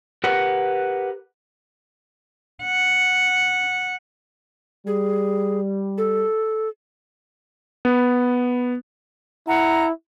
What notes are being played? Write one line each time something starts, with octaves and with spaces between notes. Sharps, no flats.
G4 A#4 B4 F#5
F#5
G3 G#4
A4
B3
E4 F#5 A#5